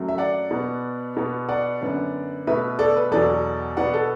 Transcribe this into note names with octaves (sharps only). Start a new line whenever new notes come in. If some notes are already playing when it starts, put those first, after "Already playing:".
Already playing: F#2 F#3 A3
E5
D5 F#5
B2 B3
B2 B3
D5 F#5
F#2 D3 B3
B2 A3 B4 E5
A4 D5
B4
E2 B2 F#3 A4 D5
B2 B3 D5 F#5
A4